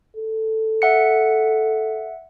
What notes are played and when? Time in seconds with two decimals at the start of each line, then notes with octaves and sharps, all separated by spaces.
0.16 A4
0.82 E5 F#5 C#7